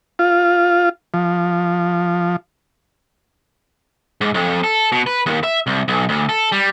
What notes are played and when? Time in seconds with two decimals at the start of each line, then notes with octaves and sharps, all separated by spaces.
0.19 F4
1.14 F3
4.21 G#2
4.34 F2
4.64 A4
4.92 B2
5.07 B4
5.26 D#2
5.44 E5
5.67 C2
5.88 B1
6.09 D2
6.29 A4
6.52 G3